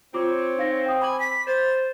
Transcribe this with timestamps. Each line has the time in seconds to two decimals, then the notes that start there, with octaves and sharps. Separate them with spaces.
0.14 C4 F4 C#5 D6
0.58 D#4 F5 A#6
0.86 G5 D#6
1.01 G#5 B5 D6 F#7
1.20 B6
1.47 C5 A6